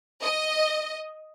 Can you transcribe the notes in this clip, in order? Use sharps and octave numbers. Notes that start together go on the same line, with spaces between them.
D#5